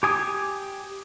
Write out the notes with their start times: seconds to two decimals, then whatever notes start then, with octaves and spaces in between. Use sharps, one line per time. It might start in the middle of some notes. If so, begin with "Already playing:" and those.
0.03 G4 G#5 D#6